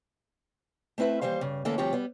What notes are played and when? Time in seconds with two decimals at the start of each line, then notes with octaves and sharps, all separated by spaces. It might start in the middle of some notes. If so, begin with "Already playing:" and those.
0.98 A3 C4 E4 B4 E5
1.21 D#2 E3 G3 C5 F5
1.41 G2 C#3
1.65 D3 E3 A3 A#3 C#4 A4
1.78 D2 G2 F3 C4 G4 C#5
1.93 G3 B3